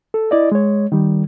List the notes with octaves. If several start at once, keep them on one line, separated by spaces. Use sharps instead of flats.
A4
E4 D5 D#5
G#3 C#5
D#3 G3